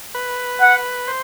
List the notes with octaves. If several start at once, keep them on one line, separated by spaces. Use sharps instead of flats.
B4
F#5
C5